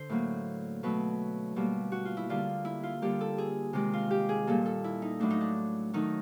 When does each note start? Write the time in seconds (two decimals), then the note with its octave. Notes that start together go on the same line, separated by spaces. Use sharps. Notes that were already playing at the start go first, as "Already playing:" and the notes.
Already playing: D3 C5
0.09 A2 F#3 A#3
0.83 B2 F#3 A3 B4
1.56 B2 G3 A#3
1.92 F#4
2.05 F4
2.17 E4
2.29 D3 G3 A#3 F4
2.65 E4
2.83 F4
3.02 D3 G3 A#3 G4
3.21 A4
3.38 G#4
3.73 C3 D#3 G#3 G4
3.93 F4
4.11 G4
4.29 G#4
4.47 A#2 G3 A#3 A4
4.66 A4
4.84 E4
5.02 D#4
5.20 A2 F#3 A3 D4
5.30 D#4
5.41 D4
5.93 D#3 F#3 A3 D#4